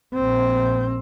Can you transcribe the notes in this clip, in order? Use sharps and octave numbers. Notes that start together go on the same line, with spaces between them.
A#1 C4